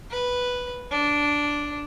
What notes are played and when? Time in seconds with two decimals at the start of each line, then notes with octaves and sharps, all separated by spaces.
0.10 B4
0.91 D4